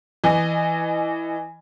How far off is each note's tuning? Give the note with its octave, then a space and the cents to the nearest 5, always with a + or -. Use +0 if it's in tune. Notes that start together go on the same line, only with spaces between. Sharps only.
E3 +0 D#5 -20 G#5 +10